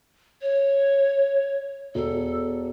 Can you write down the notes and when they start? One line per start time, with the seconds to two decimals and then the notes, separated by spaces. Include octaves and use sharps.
0.42 C#5
1.95 E1 A4